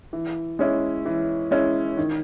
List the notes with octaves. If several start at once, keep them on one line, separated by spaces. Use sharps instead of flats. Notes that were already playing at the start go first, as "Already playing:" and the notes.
E3
G#3 C#4 E4
E3
G#3 C#4 E4
D#3